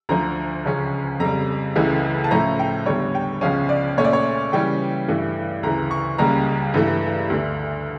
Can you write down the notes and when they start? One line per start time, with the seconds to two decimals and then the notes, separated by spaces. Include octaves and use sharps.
0.09 D2 D3 F3 A#5
0.65 C#2 C#3 F3 C#4
1.20 F2 C#3 G3 A#5
1.76 C#2 C#3 E3 A3
2.24 A5
2.31 A2 F3 A3 C#4 A#5
2.59 G5
2.86 E2 D3 G3 C#5
3.15 G5
3.41 C#2 C#3 F3 C#4 F5
3.69 D5
3.97 A#2 A3 C#4 C#5
4.04 D5
4.13 C#5
4.52 C#3 E3 G3 C#4 G5
5.08 G2 E3 A3
5.63 D2 C#3 E3 A#5
5.91 C#6
6.18 C#2 C#3 G3 A#3 A#5
6.74 G2 E3 A3
7.30 D2 D3 A3 D4